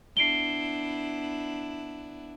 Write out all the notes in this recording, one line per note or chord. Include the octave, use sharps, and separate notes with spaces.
B3 D4 E4 C7 D7 G7